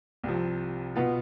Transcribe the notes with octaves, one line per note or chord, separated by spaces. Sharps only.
C2 C3 F3
B2 B3 F4